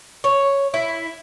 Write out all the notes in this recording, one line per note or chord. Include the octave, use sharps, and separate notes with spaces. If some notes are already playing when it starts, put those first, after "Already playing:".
C#5
E4